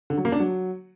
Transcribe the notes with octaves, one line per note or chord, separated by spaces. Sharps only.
D3
F#3
A#3
D4
F#3